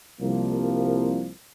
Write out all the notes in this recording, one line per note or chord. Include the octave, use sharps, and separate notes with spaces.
C2 F3 A#3